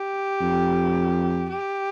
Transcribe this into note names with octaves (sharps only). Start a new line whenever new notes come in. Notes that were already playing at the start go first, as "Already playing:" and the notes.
Already playing: G4
F2
G4